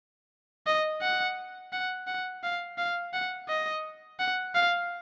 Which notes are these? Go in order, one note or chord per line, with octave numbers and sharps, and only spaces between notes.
D#5
F#5
F#5
F#5
F5
F5
F#5
D#5
F#5
F5